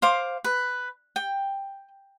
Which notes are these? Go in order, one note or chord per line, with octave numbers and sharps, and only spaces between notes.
C5 F5 D6
B4
G5